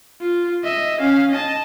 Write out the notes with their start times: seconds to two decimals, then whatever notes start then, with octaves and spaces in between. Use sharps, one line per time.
0.21 F4
0.64 D#5 E5
1.00 C#4 F5
1.31 D#5 A5